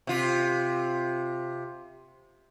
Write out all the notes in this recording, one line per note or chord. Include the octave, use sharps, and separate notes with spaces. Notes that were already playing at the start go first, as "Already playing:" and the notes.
C3 F4